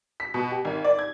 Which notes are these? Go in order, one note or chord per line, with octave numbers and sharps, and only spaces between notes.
B6
B2
G4
G#1
D5
G#6